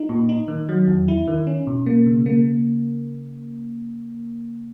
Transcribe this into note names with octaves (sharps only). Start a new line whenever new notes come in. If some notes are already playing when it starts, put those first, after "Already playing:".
Already playing: D#4
A#2
D#4
D#3
F#3
E2
E4
D#3
C#4
B2
A#3
C#3
A#3